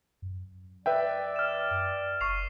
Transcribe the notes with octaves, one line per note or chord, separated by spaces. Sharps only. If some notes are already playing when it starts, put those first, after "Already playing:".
F#2
B4 D5 E5 G5
F6 E7
F#1 C#6 C7 F7